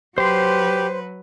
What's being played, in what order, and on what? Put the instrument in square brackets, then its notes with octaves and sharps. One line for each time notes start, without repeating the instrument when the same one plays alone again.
[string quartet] F#3 B4 [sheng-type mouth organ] G4 [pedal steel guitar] C5 C6